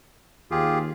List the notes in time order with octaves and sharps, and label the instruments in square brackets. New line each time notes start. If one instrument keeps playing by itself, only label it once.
[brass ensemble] D#2 [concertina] F4 G4 G#4